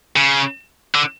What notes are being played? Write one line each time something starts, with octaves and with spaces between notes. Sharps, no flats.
C#3
D3